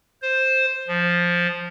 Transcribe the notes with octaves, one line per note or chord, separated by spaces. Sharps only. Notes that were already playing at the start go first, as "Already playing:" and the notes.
C5
F3